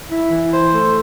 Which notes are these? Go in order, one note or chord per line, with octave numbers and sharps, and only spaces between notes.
E4
E3
C5
A3